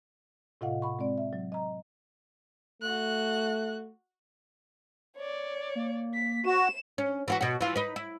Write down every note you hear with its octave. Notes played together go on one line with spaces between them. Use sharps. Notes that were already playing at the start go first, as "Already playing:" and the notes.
A2 C3 F4 D#5 F5 F#5
F#5 B5 C#6
G#3 C4 D5
E5
F#3
D#5 A#5
A3 F#4 F#6
C#5 D5
A#3
B6
F#4 E7
C#4
E3 F4 F#4
B2 F#4
E3 F4
D#4 B4
E4